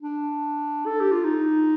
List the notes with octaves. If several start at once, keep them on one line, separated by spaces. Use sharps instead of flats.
D4
A4
G4
F4
D#4